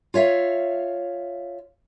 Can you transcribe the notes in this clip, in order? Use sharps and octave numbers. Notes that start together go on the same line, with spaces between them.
F4 C#5 E5 F5